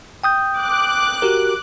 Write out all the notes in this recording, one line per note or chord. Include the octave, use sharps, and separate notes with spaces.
G5 D#6 G6
D6 F#6
F#4 G4 A#4